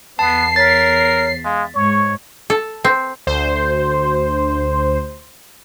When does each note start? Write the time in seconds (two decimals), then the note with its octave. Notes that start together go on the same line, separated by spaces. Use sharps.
0.19 E2 B3 A5 C7
0.56 A#4 C#5 A6 B6
1.45 G#3 F5
1.75 G#2 C#5 C#6
2.50 A4
2.84 C4
3.27 D2 C5